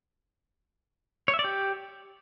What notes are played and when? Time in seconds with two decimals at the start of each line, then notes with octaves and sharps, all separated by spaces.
1.28 C#5
1.34 E5
1.39 D5
1.44 G4